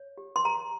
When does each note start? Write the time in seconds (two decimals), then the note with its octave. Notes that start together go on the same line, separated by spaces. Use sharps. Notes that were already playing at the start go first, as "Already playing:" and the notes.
Already playing: C#5
0.18 G4
0.36 C6
0.45 G4 A#5